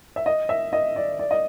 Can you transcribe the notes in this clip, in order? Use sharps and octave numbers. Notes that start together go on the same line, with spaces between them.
E5
D#5
E5
D#5
D5
D5
D#5